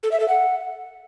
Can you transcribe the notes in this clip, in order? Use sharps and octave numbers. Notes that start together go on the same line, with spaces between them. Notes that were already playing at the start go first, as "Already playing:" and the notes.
A4
E5
A4
F#5